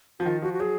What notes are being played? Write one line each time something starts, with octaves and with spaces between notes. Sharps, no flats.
F3 F#4
D#3 F4
F3 F#4
F#4
F#3 G#4